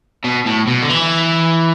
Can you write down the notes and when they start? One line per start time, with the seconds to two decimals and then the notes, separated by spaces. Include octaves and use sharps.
0.24 B2
0.46 A2
0.67 B2
0.82 D3
0.90 E3